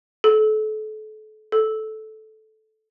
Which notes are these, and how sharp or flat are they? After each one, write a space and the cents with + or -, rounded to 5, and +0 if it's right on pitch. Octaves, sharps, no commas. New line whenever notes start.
A4 -30
A4 -10